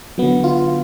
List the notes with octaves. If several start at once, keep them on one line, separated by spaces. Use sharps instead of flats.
D3 F#3 B3
F4